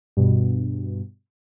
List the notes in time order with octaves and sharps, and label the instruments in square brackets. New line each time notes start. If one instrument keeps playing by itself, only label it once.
[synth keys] G2 B2